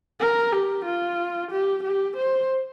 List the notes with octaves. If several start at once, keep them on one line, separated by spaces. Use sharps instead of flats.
A#4
G4
F4
G4
G4
C5